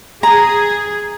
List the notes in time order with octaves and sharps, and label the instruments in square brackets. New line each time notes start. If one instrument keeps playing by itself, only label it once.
[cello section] G#4 [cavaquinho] A#5